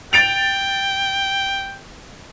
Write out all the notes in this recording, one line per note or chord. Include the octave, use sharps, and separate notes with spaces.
G5 A6 D7 F7